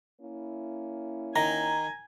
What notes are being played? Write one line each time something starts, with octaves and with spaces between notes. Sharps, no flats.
A#3 C#4 E4
D#3 G#5 A#5